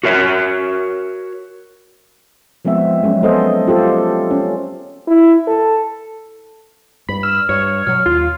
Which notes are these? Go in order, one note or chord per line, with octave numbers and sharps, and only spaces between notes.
F#4 A#4 C#5 E5
F3 G#3 B3 C4 E5
F#3 G#3 C#4
G#3 B3 A4 C5 D#5
C4 F4 G4 A4 C5
C#4
E4
A4
G2 B5
E6 F6
G2 C#5
B2 F#3 F6
D#2 F4